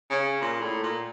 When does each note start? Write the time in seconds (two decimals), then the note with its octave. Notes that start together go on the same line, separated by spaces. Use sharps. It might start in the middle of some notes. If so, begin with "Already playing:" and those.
0.10 C#3
0.42 A#2
0.62 A2
0.83 A#2